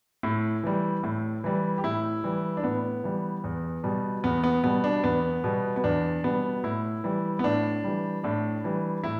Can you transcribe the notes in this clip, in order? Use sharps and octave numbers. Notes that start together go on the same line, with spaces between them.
A2 E4
E3 G3
A2
E3 G3
G4
A2 E4
E3 G3
D4
A2 B3
E3 G3
E2
B2 G3
E2 B3
B3
B2 G3 B3
D4
E2 B3
B2 G3
B3
E2 D4
B2 G3 B3
A2 E4
E3 G3
B3
A2 D4
E3 G3
A2 D4
E3 G3
A2 E4